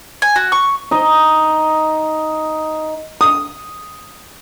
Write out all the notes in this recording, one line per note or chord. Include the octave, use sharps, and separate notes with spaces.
G#5
F#4
C#6
D#4 D#5
D#6